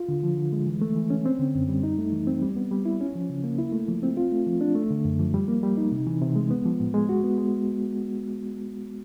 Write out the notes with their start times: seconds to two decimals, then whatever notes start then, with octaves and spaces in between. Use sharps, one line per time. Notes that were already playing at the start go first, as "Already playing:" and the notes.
Already playing: F4
0.09 D3
0.23 F3
0.37 D3
0.53 G#3
0.67 E3
0.82 A3
0.96 E3
1.10 C#4
1.26 C4
1.39 D3
1.55 F#2
1.69 G3
1.83 D#4
1.98 A3
2.13 E3
2.27 C4
2.42 G3
2.56 B3
2.71 G3
2.85 E4
3.01 C#4
3.16 F3
3.30 C#3
3.44 A#3
3.58 E4
3.73 A3
3.88 F3
4.03 C4
4.17 F4
4.32 A3
4.46 F3
4.61 D4
4.75 A3
4.91 D3
5.05 F#2
5.19 F3
5.34 G3
5.48 A#3
5.63 G3
5.77 D#4
5.92 C3
6.07 E3
6.21 C3
6.36 G#3
6.51 B3
6.65 F3
6.80 A2
6.94 G#3
7.09 F#4
7.24 B3
7.38 G#3